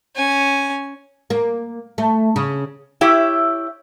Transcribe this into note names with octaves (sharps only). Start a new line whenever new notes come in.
C#4 G#5
A#3
A3
C#3
E4 G4 C#5 E5